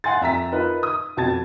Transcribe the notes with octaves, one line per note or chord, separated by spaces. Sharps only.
F5 F#5 G#5 C6 A6
F2 E5 A#5 B6
D#4 F4 A#4 B4
D#6
F2 B2 A5 G#6 A6